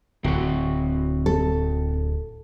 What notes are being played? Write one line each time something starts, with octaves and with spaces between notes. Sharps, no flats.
D1 C4 F#4 F#5
A4